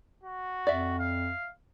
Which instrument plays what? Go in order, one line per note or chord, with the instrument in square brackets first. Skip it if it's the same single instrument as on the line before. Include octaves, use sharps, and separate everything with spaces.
[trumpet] F#4
[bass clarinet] F2 [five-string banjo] D5 E5
[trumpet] F5